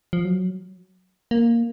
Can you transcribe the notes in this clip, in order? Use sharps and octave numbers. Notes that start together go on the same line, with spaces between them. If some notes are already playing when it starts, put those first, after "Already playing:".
F3
F#3
A#3